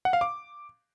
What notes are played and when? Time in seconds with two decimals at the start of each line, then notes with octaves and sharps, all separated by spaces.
0.05 F#5
0.13 F5
0.21 D6